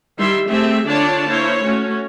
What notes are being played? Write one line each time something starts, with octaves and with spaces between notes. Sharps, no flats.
D#3 G3 E4 E5 C6
A3 C4 G4 G#4 E5
D3 D4 F4 C#5 D5 A5
A#3 E4 C5 C#5
A3 C#4 F#4